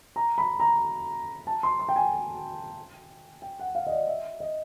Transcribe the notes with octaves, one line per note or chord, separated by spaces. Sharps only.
A#5
B5
A#5
A5
C6
C6
G5
G#5
G5
F#5
F5
D#5
D5
E5
D#5